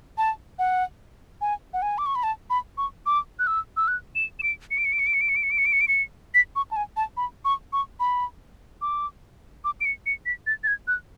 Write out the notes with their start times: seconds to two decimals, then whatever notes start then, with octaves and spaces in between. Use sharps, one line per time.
0.18 A5
0.59 F#5
1.41 G#5
1.74 F#5
1.82 G#5
1.98 D6
2.06 C#6
2.15 B5
2.23 A5
2.50 B5
2.78 C#6
3.06 D6
3.39 F#6
3.47 E6
3.77 E6
3.88 F#6
4.15 E7
4.39 E7
4.43 D7
4.71 C#7
4.78 D7
4.85 C#7
4.93 D7
4.99 C#7
5.07 D7
5.14 C#7
5.21 D7
5.29 C#7
5.36 D7
5.43 C#7
5.51 D7
5.58 C#7
5.66 D7
5.73 C#7
5.81 D7
5.88 C#7
6.35 B6
6.56 C#6
6.71 A5
6.76 G#5
6.97 A5
7.17 B5
7.45 C#6
7.73 C#6
8.00 B5
8.82 D6
9.65 D6
9.81 D7
9.85 C#7
10.06 C#7
10.26 B6
10.47 A6
10.64 A6
10.67 G#6
10.88 F#6